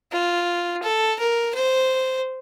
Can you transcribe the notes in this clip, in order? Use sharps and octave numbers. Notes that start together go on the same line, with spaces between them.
F4
A4
A#4
C5